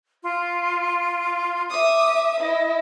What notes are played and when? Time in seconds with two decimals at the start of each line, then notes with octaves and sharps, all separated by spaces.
0.23 F4
1.70 E5 D6 D#6
2.41 E4 D#5